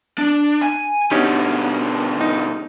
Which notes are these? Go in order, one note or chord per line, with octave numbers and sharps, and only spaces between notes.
D4
G#5
B2 D3 C#4 D#4 G4
D#4